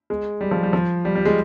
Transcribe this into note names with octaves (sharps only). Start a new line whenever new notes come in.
G#3
G3
F3
G3
F3
G3
G3
G#3